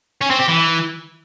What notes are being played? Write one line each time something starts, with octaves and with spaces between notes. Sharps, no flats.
C#4
C4
G4
E3